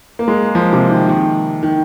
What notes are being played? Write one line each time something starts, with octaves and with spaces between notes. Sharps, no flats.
A#3
G#3
F3
C3
D#3
D#3
D#3